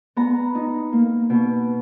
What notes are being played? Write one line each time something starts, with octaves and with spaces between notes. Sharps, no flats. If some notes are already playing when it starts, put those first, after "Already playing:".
B3 A#5
D#4
A#3
B2